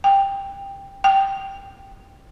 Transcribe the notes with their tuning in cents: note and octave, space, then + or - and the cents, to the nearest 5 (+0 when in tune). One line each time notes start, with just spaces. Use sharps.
G5 +10
G5 -10